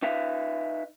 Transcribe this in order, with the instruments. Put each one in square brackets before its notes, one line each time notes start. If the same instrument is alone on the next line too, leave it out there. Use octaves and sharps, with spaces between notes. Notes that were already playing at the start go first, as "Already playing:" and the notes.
[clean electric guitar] D#4 B4 E5 F5